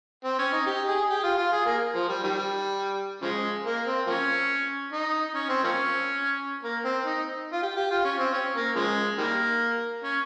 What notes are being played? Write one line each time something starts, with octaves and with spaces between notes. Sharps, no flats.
C4
C#4
D#4
G4
G#4
G4
F4
F4
G#4
A#3
F3
G3
D#3 G3
C#3 F3 G#3
A#3
C4
F3 A#3 C#4
D#4
C#4
C4
F3 A#3 C#4
A#3
C4
D#4
F4
G4
G4
F4
C#4
C4
C#4
A#3
C#3 F3 G#3
D#3 G3 A#3
C#4